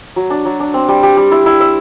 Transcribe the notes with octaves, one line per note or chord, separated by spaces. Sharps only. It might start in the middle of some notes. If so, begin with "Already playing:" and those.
F#3
D4
F#3
D4
C4
G3
G3
G3
E4
E4
E5